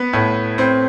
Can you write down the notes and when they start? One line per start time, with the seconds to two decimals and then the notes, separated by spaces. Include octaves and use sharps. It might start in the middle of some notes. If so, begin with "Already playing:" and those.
Already playing: B3 B4
0.13 A2
0.58 C4